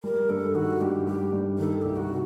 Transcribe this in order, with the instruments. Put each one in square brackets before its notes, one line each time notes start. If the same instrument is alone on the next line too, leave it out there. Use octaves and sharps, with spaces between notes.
[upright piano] G3 [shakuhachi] A#4
[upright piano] G2 [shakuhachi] A4
[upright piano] D#3 [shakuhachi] F#4
[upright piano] G2 [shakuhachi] G4
[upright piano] G3 [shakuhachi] G4
[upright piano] G2
[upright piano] D#3 [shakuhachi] A4
[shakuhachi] A4
[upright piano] C2 [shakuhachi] G4
[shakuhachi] F#4
[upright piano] C3